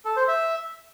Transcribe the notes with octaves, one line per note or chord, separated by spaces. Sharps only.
A4
C5
E5